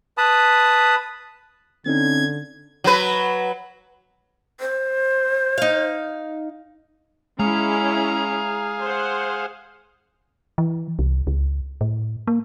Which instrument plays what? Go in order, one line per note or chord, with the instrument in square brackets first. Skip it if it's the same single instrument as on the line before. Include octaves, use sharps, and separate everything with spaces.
[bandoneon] B4 A5 B5 D#6
[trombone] D3 [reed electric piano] C4 C#4 D#4 [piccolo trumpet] G#6
[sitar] F#3 B4
[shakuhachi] C5
[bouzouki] D#4 F5
[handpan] G#3 [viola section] C#4 E4 [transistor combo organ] G#4 F5 [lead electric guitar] A#5
[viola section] C5 F#5
[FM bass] E3
C2
C#2
A2
A#3